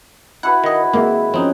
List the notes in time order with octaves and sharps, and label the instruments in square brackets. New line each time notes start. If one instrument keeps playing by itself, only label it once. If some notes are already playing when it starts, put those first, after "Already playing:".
[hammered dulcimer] E4 F#4 B4 [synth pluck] F#5
[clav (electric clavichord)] D#3 D#5
[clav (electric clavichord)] G#1 [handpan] G#3 E5 [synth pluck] A#3
[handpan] F3 C#4 [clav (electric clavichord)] C4 D#4